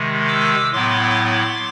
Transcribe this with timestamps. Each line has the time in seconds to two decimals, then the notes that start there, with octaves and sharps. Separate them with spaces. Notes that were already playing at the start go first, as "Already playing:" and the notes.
Already playing: C3 D#3 G#3
0.28 D6 E6
0.73 A2 F#3 B3 E4 C6 D6